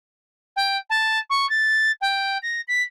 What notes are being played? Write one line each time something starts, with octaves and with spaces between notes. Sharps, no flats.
G5
A5
C#6
A6
G5
A#6
B6